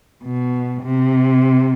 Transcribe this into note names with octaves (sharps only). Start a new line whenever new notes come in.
B2
C3